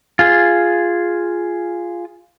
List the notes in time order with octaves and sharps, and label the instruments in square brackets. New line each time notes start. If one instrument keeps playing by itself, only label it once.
[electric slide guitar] F4 G#4